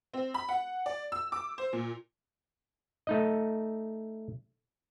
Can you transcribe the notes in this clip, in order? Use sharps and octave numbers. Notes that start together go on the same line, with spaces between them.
C4
B5
F#5
D5
E6
D6
C5
A#2
A3 D#4 D#5